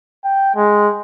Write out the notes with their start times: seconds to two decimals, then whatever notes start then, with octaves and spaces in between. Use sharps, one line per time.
0.24 G5
0.55 G#3